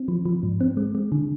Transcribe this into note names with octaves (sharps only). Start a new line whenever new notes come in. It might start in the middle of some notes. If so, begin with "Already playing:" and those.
Already playing: C4
F3
F3
G#2
C4
G#3
G#3
D3